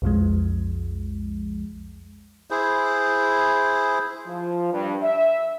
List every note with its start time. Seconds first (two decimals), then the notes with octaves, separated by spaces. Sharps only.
0.02 B1 F2 F3 G#3
2.50 E4 G#4 C5
4.27 F3
4.72 G2
5.03 E5